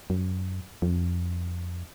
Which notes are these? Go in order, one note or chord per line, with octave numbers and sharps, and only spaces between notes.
F#2
F2